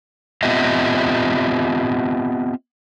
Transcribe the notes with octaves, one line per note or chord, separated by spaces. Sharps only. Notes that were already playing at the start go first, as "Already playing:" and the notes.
B3 C4 F4 G4 D#5 E5